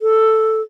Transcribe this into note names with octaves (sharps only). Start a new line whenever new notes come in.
A4